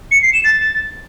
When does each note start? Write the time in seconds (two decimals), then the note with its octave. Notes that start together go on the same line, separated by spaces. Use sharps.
0.11 C#7
0.22 C7
0.33 E7
0.44 A6